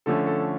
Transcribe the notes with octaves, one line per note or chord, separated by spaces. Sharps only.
D3 F3 A3 C#4 A4
A4